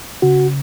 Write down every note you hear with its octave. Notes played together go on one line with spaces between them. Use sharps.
C#3 F#4